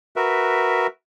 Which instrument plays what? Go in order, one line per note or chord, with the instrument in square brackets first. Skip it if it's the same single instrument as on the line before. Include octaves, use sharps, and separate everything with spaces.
[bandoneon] F#4 A#4 B4 E5